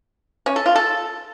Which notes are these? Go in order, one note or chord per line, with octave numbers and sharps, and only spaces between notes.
C#4
A4
F4
A4